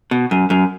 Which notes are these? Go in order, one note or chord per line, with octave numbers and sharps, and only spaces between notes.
B2
F#2
F#2